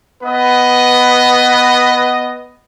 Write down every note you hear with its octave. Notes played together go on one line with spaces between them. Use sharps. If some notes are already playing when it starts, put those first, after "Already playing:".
B3 B4 D#5